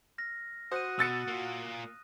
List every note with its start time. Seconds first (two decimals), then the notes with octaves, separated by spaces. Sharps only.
0.18 F6 A#6
0.72 F#4 C5 D#6 F#6 D#7
0.99 B2 E6 A6 C#7
1.28 A#3 F4